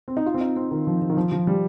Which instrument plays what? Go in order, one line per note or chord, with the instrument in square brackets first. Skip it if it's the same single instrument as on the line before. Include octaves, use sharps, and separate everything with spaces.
[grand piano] C4
D#4
F4
C4
D#4
C4
D#3
F3
F3
D#3
F3
F3
G3